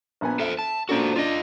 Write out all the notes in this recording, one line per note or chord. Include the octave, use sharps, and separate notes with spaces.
A#1 B3 G#5
A4 C5 E5
A5
A#2 D4 F#4 A4 C5
D4 F4 D5 D#5